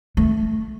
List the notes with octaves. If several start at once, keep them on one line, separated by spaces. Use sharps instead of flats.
A3